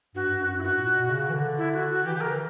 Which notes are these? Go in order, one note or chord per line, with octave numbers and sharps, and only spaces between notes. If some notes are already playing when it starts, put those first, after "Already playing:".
G2 F#4
G2
F#2
E4
G2 F#4
A#2
B2
C#3
E3
D3
E4
F#4
F#4
E3 G4
G4
D3 A#4
E3